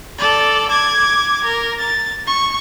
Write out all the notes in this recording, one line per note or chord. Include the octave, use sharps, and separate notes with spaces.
A4 D5
D6 G#6
A#4
A6
C#6